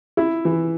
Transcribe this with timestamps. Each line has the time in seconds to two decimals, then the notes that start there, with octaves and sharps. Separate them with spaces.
0.17 E4
0.45 E3